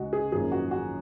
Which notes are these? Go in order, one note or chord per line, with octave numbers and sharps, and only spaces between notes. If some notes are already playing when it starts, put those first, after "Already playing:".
Already playing: C#2 C#3 G#3 D#4 F#4
G#4
G#1 F#2 F3 A#3 G#4
F#4
F#4